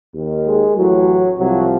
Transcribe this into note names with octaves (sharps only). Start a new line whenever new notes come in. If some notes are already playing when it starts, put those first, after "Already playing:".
D#2 D#3
G#3
A1 A2 E3 F#3
C2 C3 F3 F#3